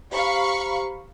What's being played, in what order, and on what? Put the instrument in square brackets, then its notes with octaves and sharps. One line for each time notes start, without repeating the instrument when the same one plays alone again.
[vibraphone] G4 C5 A#5 [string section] F5 B5 C#6